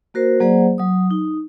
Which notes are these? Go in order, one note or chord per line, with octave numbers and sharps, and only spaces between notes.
A#3 F#4 A#4 C5
F#3 A#3 G#4 C5 D5 F#5
F#3 D#6
D#4